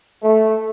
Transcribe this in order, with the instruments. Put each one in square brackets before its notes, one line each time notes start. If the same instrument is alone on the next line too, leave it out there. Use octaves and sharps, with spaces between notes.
[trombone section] A3